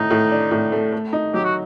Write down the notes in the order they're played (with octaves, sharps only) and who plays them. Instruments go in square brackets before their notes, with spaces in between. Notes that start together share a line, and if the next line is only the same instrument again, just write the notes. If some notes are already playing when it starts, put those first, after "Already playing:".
Already playing: [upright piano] A2 A3 [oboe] D#4
[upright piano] A2
D4
A2
A3
A3
D#4
[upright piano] F#3 [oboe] G4
[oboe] F#4